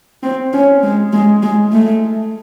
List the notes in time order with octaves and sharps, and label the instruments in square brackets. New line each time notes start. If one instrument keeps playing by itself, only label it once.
[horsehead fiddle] C4
C#4
G#3
G#3
G#3
A3